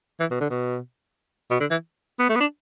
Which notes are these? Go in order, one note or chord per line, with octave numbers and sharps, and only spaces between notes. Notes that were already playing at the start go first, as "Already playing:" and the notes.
E3
B2
D3
B2
B2
D3
E3
B3
A3
B3
D4